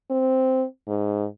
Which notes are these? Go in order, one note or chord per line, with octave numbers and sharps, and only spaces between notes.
C4
G#2